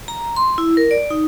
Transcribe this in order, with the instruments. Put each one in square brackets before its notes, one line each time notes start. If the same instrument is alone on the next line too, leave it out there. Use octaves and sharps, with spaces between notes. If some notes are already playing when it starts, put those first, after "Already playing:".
[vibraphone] A#5
C6
E4
A#4
D5
D#4